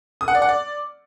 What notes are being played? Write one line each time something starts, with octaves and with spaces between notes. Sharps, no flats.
D#6
F#5
D5
F#5
D5